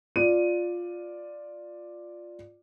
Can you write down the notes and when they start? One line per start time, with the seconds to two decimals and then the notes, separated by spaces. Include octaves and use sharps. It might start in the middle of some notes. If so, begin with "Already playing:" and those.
0.16 F4 D5 D#7